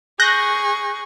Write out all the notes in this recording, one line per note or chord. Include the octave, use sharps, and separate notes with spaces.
G#4 C#6 F#6 G6 A#6